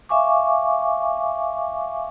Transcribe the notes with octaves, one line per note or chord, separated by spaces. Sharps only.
E5 F5 G#5 C#6 D6